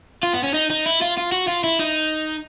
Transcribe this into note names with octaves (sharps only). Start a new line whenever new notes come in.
F4
B3
C#4
D#4
D#4
E4
F4
F4
F#4
F4
E4
D#4